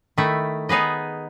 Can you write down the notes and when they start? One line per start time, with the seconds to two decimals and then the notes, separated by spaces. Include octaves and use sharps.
0.17 D#3 A3 E4
0.69 B3 D#4 G#4 B4 D#5